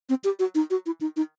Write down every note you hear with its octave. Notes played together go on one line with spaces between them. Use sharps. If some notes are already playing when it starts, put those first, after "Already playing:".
C4
G4
F#4
D#4
F#4
E4
D#4
D#4